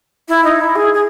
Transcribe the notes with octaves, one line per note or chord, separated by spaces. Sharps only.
E4
D#4
E4
G#4
G#4